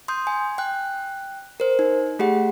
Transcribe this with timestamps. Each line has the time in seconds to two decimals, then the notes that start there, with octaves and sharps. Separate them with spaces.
0.08 C6 D#6 G6
0.27 G#5
0.58 G5 F#6
1.60 A#4 C5
1.79 D#4
2.19 A3 G4 G#4 F#5